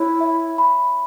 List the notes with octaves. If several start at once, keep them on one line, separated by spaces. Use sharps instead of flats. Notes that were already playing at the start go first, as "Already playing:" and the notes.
Already playing: E4 C#5
E5
B5